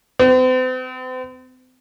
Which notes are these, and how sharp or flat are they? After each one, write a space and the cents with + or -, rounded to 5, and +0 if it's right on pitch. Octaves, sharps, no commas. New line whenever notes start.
C4 -40